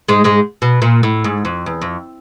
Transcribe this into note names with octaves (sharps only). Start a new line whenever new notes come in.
G#2 G#3
G#2 G#3
B2
A#2
A2
G#2
F2
E2
F2